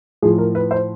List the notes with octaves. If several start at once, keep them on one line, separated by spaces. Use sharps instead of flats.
A2 F3 G#4
A#4
B4
C5